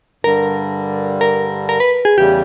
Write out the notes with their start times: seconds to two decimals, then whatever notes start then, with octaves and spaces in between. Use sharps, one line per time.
0.24 G2 D3 G3 A#4
1.21 A#4
1.69 A#4
1.80 B4
2.05 G#4
2.16 E2 C#3 E3 G3 G4